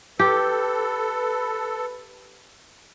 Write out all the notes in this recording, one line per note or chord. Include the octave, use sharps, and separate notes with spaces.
G4 A4 B4